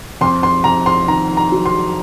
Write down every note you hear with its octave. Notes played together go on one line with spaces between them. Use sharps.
F2 C6
C6
F2 A#5
C6
D#3 A#5
A#5
F#3
C6